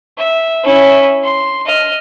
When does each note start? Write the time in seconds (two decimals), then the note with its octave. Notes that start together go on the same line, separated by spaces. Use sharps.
0.17 E5
0.64 C#4 E4
1.23 C6
1.66 D#5 F6